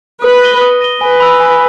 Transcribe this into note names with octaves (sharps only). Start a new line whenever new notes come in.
B4 D#6
A#6 D#7 G7
D#6
A#6 D#7 G7
B4 G#5
B5 E6
G#5